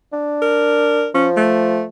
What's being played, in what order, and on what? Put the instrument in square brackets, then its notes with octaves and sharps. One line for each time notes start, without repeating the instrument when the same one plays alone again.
[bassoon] D4
[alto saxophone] A#4
[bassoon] F3 [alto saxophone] C#4
[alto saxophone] A3